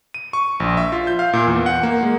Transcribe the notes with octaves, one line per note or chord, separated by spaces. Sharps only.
D#7
C#6
A#1
E5
F4
G6
F5
A#2
E2
F#5
A#3
G#3